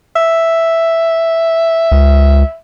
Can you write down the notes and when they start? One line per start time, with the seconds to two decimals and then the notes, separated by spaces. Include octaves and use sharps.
0.16 E5
1.92 C#2